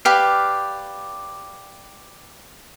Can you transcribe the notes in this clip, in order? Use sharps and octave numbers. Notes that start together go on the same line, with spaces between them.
G4 B4 D5 F5